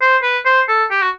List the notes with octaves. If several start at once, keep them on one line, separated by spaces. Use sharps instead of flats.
C5
B4
C5
A4
G4
F#4